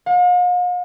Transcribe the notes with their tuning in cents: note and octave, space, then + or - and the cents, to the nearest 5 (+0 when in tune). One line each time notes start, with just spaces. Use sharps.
F5 +45